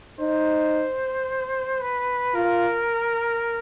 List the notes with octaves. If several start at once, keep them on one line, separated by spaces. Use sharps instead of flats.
D#4 C5
B4
F4 A#4